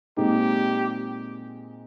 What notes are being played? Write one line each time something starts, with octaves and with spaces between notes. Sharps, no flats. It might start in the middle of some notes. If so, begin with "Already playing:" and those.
A#2 G#3 C4 D#4 G4